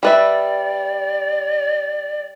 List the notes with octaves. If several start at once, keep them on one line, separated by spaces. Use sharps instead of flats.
G3 B4 D5 E5